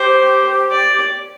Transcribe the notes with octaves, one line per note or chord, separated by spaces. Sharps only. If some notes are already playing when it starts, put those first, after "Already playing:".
Already playing: G4 C5
D5